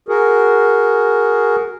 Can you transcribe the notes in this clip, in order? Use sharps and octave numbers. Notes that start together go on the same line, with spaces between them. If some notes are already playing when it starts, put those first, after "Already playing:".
F#4 G#4 A#4